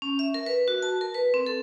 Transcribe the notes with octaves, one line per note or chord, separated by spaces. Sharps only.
C#4
E5
A#4
B4
F#4
A5
A#4
B4
C4
A4